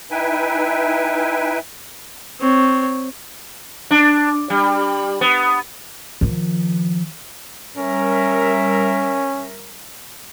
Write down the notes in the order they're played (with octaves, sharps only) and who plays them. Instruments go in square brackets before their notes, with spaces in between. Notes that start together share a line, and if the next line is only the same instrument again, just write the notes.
[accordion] D#4 E4 B4 E5 G5 G#5
[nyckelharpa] C4 C#5
[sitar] D4
G3
B3
[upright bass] D#3 F3
[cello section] G3 A#4 E5 [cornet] C#4